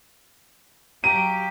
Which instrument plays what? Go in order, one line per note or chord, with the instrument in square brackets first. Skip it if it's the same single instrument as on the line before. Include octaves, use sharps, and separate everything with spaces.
[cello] F#3 G4 [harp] F5 A#5 [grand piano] D#7